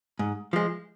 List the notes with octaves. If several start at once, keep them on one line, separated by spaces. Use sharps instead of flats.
G#2
F3 G#3